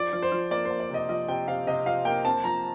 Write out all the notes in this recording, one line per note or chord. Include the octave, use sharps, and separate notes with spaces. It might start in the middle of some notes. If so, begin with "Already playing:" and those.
Already playing: F3 D5
F3
C5
F3
A#3 D5
C5
A#3
D5
C3 D#5
F3 D#5
C3 G5
C3 F5
C3 D#5
F3 F5
A#3 G5
C4 A5
F3 A#5